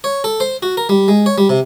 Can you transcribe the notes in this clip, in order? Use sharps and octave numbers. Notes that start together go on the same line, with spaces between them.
C#5
A4
C5
F#4
A#4
G3
G#3
C#5
G3
C3